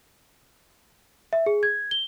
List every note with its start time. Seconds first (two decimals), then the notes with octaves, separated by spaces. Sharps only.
1.33 E5
1.46 G#4
1.63 G#6
1.91 G7